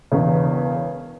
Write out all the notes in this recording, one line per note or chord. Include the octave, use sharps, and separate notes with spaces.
E1 E2 C#3